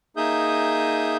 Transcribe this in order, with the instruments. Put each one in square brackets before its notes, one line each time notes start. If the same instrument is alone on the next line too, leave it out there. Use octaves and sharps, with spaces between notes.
[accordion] A#3 D#4 G#4 E5 D#6 G6